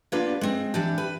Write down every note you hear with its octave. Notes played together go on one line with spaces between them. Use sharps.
A#3 B3 D4 F4 G4 B4
G#3 C4
E3 D4 G4
B4